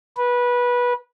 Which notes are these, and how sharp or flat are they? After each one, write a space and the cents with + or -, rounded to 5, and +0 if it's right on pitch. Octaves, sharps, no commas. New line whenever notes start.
B4 -20